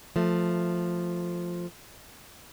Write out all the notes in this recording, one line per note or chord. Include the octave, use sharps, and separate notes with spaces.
F3 A3